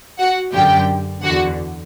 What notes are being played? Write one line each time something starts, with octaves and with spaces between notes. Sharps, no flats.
F#4 F#5
F#2 D3 G4 G5
E2 D3 F#4 F#5